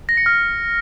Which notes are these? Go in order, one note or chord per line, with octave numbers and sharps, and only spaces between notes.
A#6
C#7
F6